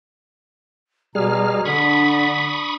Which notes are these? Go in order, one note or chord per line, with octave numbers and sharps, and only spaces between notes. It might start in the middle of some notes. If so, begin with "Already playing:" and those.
B2 G3 G#4 A#5 F6
D3 D4 B5 C#6 D#6 B6